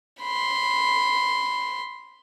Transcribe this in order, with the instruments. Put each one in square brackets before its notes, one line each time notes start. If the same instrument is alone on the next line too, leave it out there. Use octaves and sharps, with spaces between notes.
[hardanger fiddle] B5 C6